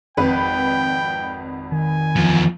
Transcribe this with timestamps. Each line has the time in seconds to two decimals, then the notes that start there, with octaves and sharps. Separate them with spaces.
0.17 G#1 F2 B4 G5
1.72 D#3 G#5
2.16 E2 F3